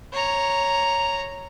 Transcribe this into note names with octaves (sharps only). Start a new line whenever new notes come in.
C#5 A#5